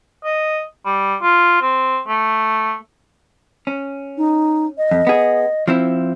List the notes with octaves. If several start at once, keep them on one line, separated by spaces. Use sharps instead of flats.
D#5
G3
F4
C4
A3
C#4
D#4
D#5
F2
B3 G#4
F3 C4 E4